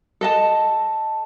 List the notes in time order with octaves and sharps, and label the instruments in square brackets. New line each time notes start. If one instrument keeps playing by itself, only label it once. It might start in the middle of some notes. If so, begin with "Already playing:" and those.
[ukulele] A4 D#5 A5